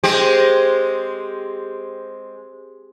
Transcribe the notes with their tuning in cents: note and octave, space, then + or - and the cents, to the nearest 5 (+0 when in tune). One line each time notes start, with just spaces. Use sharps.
G#3 +0 C4 +0 G4 +0